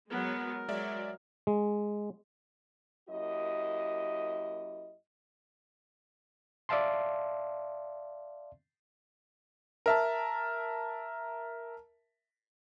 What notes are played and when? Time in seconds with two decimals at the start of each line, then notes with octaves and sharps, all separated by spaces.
0.12 F#3 G#3 B3 A#4
0.68 F#3 G#3 D5 E5
1.47 G#3
3.09 F#2 A#3 E4 G4 D#5
6.69 D5 E5 F5 A5 C6
9.86 A#4 E5 A5